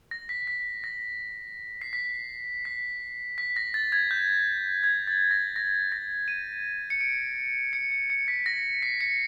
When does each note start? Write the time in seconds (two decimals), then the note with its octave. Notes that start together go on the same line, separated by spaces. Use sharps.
0.11 A#6
0.29 B6
0.47 B6
0.84 A#6
1.81 C7
1.93 B6
2.65 B6
3.38 B6
3.56 A#6
3.74 A6
3.92 G#6
4.11 G6
4.84 G#6
5.08 A6
5.31 A#6
5.56 A#6
5.92 A#6
6.28 D#7
6.90 C#7
7.01 D7
7.73 C#7
7.92 C#7
8.10 C#7
8.28 B6
8.46 A#6
8.83 C7
9.01 C#7